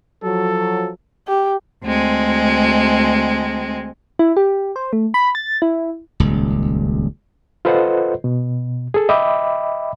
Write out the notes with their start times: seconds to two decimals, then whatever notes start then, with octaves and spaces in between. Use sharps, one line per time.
0.23 F3 F#3 A4
1.28 G4
1.85 D2 G#3 C4
4.19 E4
4.37 G4
4.76 C5
4.93 A3
5.14 B5
5.35 A6
5.62 E4
6.20 D#1 C#2
7.65 F4 A4 B4 C5 D#5 F#5
8.24 B2
8.94 G#4 A4
9.09 D#5 E5 G5 B5 D6